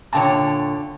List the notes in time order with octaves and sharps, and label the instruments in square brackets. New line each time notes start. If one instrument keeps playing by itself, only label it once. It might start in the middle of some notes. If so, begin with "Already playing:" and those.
[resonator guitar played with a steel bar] A#2 D3 C#5 [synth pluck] G5 A5